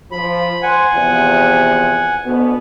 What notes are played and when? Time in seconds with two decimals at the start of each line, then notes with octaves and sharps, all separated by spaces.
0.12 F3 B5
0.62 C5 F#5 G#5
0.94 E2 C3 F3
2.25 D2 B2 B3